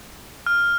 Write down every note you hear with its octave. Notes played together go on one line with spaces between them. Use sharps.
F6